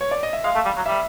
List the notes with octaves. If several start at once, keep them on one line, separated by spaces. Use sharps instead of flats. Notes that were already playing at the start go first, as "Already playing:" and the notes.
C#5
D5
D#5
E5
G#3 F5
A3
G3
F#3
G3 E5